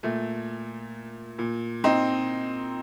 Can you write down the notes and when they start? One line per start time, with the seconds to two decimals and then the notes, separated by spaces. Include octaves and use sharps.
0.03 A#2 A3
1.39 A#2
1.84 C4 D#4